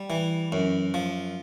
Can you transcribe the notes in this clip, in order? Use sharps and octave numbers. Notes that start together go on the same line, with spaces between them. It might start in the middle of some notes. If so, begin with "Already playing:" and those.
Already playing: G3
E3
F#2
F3